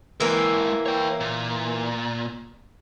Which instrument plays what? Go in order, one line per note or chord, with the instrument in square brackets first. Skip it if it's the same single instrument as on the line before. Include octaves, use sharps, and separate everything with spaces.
[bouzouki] E3 A#3 [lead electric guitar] G#3 A#4
[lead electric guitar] C#5 G5
A#2